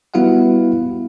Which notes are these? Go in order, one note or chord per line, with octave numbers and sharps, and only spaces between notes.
G3 B3 E4 F#4 F5 F#5